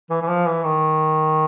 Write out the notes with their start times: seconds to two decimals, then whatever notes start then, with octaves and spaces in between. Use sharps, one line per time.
0.10 E3
0.22 E3
0.28 F3
0.47 E3
0.65 D#3